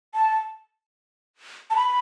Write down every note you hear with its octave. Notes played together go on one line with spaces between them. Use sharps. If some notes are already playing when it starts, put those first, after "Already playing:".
A5
A5
B5